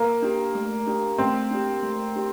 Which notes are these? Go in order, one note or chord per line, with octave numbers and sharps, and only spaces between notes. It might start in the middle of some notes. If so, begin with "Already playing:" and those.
Already playing: A#3
D4 G4
A3
D4 G4
A3 C4
D4 G4
A3
D4 G4